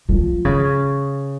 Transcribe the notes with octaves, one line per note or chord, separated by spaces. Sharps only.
F3
C#3